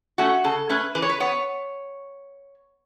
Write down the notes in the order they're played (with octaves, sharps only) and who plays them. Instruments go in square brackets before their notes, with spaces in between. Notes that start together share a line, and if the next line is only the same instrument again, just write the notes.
[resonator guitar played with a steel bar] A3 C#4 F#4
C#3 A4
A3 C#4 B4
E3 B4
C#5
B4
B3 C#5